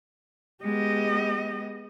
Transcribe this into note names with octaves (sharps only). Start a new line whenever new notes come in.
G#3 B3 G4 D#5